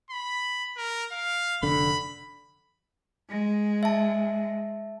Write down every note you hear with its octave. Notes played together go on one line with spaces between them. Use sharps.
B5
A#4
F5
F1 D3 B5
G#3
E5 A5